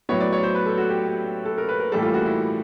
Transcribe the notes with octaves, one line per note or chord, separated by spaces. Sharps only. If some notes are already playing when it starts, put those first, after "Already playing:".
A2 F#3 B3 C#5
D5
C#5
C5
B4
A4
F#4
G4
A4
A#4
B4
A#4
A2 E3 G3 A#3 A4
F4
F#4
E4